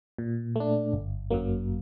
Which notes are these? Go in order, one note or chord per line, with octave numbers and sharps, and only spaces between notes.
A#2
A3 D4
G1
F#2 F#3 A#3